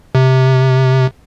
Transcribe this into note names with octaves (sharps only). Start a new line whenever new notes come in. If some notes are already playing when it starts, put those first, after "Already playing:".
C3